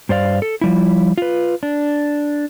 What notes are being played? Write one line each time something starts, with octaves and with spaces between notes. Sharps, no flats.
G2 C5 D5 F5
A4
F3 G3 E4
F4 B4
D4